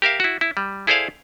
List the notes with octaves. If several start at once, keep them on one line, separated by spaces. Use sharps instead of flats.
G4 A#4 E5 F5
E4 F#4
E4
G3
E4 G#4 A4 C5 D5 F5